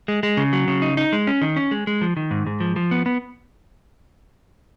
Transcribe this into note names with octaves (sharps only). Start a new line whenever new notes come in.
G#3
G#3
C#3
F#3
C#3
D#4
D#4
G#3
C#4
D#3
C#4
G#3
G#3
F3
D#3
G#2
G#2
F3
F3
B3
B3